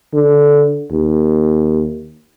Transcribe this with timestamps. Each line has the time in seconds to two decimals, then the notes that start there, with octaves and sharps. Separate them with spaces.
0.14 D3
0.91 D#2